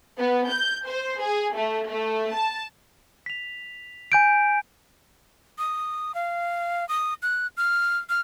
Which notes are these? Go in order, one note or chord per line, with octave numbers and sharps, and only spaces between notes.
B3
G6
C5
G#4
A3
A3
A5
B6 F7
G#5 G6 D7
D#6
F5
D#6
F#6
F6
F6